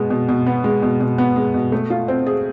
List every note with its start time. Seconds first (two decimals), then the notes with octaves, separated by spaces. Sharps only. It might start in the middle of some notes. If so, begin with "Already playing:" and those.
Already playing: B2 G#3 B3
0.10 B2
0.28 B2
0.46 B3
0.64 G#3
0.82 B2
1.00 B2
1.18 B3
1.36 G#3
1.54 B2
1.72 A3
1.90 F4
2.08 C4
2.26 G#4